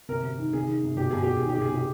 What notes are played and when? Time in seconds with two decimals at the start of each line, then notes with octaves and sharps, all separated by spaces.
0.09 C3 A#4
0.23 C3
0.39 D#3
0.53 C3 G#4
0.68 D#3
0.83 C3
0.97 B2 G4
1.11 B2 G#4
1.23 B2 G4
1.37 G#4
1.42 D#3
1.49 G4
1.57 C3 G#4
1.72 C3 G4